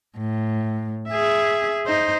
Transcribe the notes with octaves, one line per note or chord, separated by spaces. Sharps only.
A2
G#4 E5
D#4 C5